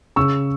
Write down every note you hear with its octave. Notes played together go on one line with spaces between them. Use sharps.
C#3 C#6 E6